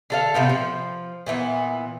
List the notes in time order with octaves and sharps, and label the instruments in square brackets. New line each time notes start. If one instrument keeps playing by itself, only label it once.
[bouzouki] D3 A4 F5
A2 C3 B3 G4
F3
A#2 E3 A#3 B3